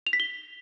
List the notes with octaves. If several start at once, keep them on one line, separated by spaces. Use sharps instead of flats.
F7
B6
G7